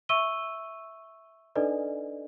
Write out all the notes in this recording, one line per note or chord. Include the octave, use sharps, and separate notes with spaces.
E5 C#6 E6 D#7 G7
D4 D#4 A4 B4 D5 D#5